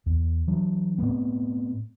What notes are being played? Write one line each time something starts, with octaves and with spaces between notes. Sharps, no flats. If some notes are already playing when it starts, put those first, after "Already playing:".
E2
E3 F#3 D4
A2 A3 B3 C4